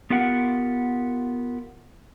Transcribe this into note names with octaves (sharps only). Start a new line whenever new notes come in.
B3 F4 G4 A#4 F#5